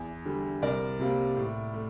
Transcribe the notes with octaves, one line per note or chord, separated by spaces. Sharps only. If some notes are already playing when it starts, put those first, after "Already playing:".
Already playing: E2
D3 G3
C2 A#4 D5
C3 G3 A#3
A2
A3